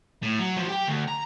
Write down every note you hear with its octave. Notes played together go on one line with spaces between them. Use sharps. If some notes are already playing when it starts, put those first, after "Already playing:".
A2
F#3
F3 F#3
G4 G5
D2
A#5